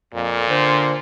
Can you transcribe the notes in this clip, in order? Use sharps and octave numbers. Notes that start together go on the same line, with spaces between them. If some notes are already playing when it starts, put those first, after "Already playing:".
F2 A#2
D3 C5